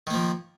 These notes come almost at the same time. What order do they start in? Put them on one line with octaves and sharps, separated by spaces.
D#3 A#3 F3